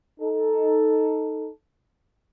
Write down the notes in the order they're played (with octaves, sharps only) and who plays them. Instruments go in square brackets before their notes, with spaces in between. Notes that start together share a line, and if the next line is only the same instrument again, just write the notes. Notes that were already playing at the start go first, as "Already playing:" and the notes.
[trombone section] D#4 A4